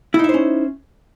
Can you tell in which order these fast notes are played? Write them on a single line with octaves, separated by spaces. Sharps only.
E4 D#4 E5 C5 C#4